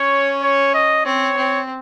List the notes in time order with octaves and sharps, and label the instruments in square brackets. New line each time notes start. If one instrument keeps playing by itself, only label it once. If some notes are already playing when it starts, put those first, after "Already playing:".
Already playing: [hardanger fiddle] C#4 [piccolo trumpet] C#5
[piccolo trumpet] C#5
D#5
[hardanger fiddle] C4 [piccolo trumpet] C#5
[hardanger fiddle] C4